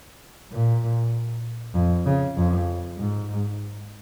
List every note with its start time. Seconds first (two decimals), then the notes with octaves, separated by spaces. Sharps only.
0.52 A#2
1.75 F2
2.06 C#3
2.37 F2
2.98 G#2